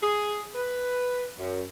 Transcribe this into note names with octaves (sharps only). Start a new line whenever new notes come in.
G#4
B4
F#2